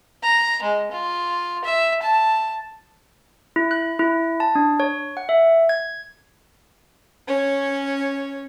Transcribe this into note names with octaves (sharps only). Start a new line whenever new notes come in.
A#5
G#3
F4
E5
A5
E4
F#6
E4
A5
D4
C#5
F#5
E5
G#6
C#4 C#5